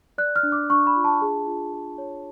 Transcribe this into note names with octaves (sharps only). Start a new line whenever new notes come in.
D5 F#6
F6
D4
D6
D4 C#6
B5
F4
A5
G#4
F4
G#4
C#5